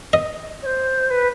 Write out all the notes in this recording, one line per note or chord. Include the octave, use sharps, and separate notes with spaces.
D#5
C#5
C5
B4